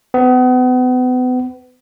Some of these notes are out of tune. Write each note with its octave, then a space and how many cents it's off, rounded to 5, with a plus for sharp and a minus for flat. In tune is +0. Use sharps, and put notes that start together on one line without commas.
B3 +35